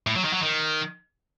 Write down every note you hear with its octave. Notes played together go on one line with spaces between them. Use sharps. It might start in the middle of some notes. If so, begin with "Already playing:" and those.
A2
F#3
D#3
F#3
D#3